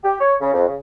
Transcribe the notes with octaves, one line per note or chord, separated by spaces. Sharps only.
G4
C#5
C#3
F2
C#3